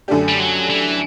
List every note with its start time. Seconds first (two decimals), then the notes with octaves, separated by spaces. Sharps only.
0.08 F#2 D3 A3 D4 G4
0.29 G3
0.39 F#3
0.70 E3